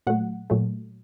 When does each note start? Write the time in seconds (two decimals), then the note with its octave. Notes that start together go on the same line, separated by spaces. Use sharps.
0.07 A#2 F#3 A3 F#5
0.50 A#2 F#3 A3